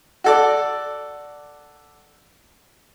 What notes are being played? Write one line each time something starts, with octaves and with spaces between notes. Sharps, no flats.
F#4 A4 D5